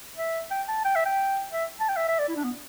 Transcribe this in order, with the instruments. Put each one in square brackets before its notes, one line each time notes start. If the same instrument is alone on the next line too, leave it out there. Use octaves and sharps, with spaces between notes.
[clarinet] E5
G5
A5
G5
E5
G5
E5
A5
G5
E5
E5
D5
E4
D4
B3